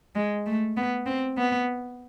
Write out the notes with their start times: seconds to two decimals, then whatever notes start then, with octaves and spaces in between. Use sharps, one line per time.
0.15 G#3
0.46 A3
0.77 B3
1.06 C4
1.38 B3